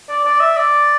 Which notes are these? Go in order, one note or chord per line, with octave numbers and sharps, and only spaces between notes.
D5
D5
E5
D5